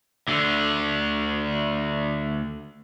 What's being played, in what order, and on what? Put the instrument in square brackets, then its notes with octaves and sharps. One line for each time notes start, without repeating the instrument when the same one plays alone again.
[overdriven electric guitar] D2 D3